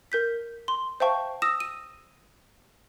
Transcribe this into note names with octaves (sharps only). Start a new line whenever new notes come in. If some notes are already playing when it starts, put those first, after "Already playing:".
A#4 G6 B6
C6
C5 E5 F5 G5 A5 C#6
D#6 E6 A#6 E7
D#7